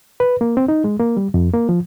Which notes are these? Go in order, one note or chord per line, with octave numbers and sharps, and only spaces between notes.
B4
A#3
C4
D#4
G#3
A#3
G3
F2
A#3
F3